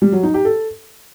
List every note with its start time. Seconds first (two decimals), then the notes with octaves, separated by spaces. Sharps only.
0.02 G3
0.12 F#3
0.23 D#4
0.34 G4
0.45 A4